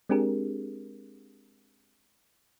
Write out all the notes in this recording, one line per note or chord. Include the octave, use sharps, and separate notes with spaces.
G#3 C4 D4 G4 G#4 A#4